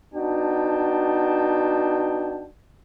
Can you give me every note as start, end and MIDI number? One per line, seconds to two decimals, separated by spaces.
0.14 2.45 59
0.14 2.45 62
0.14 2.45 63
0.14 2.45 66
0.14 2.45 79
0.14 2.45 81